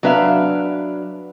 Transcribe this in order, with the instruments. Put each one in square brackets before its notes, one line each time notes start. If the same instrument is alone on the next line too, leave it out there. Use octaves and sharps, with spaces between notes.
[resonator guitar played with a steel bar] F#3 D4 B4 E5 F5